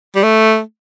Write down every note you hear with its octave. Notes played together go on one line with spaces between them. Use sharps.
G3
A3